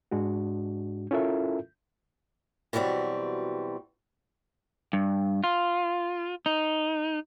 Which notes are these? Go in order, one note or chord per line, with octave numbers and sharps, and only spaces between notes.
G#2 G#3 D4 F#4
C#4 E4 F4 A4 A#4 E5
B2 E3 F#3 G3 C4
G2
F4
D#4